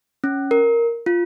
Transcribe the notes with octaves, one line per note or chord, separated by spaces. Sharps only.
C#4
A#4
F4